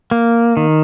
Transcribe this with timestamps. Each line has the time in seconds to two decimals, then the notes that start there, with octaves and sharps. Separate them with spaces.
0.11 A#3
0.57 D#3